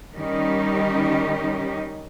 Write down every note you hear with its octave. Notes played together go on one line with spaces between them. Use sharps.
D#3 G3 C#4 D#4 G4